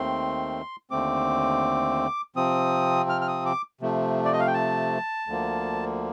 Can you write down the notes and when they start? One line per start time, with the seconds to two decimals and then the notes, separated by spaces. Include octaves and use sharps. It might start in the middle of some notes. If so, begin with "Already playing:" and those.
Already playing: D#2 D#3 A3 C4 C6
0.91 D#2 D3 A3 C4 D6
2.36 C3 F3 C4 D#6
3.09 F6
3.21 F6
3.28 D#6
3.45 D6
3.81 C3 F3 A3
4.25 D5
4.33 D#5
4.40 F5
4.47 G5
4.54 A5
5.27 D2 D3 F3 A#3